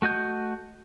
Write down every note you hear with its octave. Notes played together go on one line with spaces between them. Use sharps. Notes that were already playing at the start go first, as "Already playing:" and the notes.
A3 F#4 D#5 G6